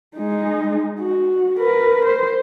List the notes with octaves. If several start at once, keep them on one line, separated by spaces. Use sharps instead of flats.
G#3 D#4
F#4
A#4 B4
C5